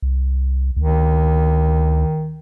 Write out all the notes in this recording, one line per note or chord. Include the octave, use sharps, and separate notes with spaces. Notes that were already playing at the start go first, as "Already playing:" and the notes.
C2
D2 D#3